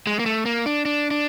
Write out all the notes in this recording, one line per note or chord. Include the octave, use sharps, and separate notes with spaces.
G#3
A#3
A3
A#3
D4
D4
D4